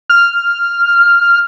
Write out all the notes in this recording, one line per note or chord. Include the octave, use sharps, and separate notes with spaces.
F6